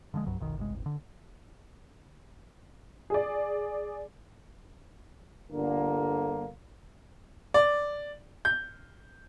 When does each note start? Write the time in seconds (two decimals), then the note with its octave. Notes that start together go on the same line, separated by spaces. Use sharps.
0.14 D3 F3 F#3 G#3
0.26 C2 G2 F#3
0.39 F1 B1 D#3
0.57 G1 C2 G#3
0.73 D#1 G#1
0.86 D3
3.10 G#4 D5
5.51 G1 D3 A#3
7.54 D5
8.45 G6